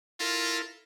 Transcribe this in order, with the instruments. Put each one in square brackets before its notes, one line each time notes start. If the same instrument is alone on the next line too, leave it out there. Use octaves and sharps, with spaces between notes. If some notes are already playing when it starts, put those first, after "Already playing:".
[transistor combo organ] E4 A4 A#4 [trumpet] F4